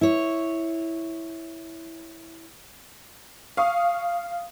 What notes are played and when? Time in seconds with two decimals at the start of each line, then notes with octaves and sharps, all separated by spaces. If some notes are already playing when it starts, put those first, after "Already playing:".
0.01 E4 C#5
3.57 F5 C#6 D#6